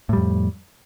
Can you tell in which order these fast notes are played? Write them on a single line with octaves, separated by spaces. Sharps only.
A2 G3 F2